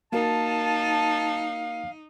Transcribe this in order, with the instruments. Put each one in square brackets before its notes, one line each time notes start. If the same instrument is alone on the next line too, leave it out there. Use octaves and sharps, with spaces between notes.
[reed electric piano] A#3 F#4 A#4 [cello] D#4 [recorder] F5 [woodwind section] A5